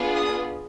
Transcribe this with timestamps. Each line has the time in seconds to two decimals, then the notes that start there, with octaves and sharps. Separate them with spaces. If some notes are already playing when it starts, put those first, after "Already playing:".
Already playing: B3 D4 F4 G#4
0.15 D#6